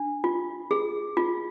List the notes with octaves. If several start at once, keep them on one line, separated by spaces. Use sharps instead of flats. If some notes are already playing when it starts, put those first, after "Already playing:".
Already playing: D4
F4
G#4
F4